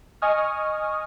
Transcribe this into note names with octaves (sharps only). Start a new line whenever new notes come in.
D#5 G#5 C#6 D#6 F6